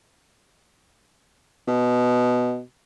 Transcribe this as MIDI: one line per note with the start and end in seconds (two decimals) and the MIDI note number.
1.68 2.61 47